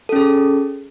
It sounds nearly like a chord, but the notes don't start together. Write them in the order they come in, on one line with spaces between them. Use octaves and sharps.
A4 C#4 G#4